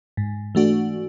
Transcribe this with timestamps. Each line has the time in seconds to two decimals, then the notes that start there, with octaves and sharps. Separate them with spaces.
0.17 G#2
0.55 E3 A3 D4 F#4